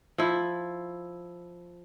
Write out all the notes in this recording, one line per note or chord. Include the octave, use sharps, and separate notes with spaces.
F3 E4